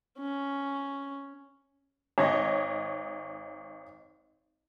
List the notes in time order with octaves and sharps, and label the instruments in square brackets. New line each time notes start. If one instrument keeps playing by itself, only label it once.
[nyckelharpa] C#4
[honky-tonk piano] G#1 C#5 D#5